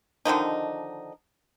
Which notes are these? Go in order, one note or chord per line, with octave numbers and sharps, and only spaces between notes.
D3 D#3 F3 D#4